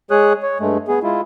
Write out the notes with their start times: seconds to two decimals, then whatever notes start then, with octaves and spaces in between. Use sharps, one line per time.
0.11 G#3 G#4 C#5 D#6 F#6
0.43 C#5
0.60 G2 G#3 A3
0.88 B3 G#4
1.03 G#3 E4 F4